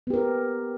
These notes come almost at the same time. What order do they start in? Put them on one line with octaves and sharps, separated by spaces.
B3 G4 A#4